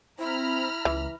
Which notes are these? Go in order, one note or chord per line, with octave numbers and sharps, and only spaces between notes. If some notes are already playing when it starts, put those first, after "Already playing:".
C4 E4 A#5 B5 F6
C#2 E3